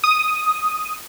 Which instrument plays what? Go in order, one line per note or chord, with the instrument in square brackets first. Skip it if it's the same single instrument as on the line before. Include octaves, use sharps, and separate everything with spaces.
[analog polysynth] D#6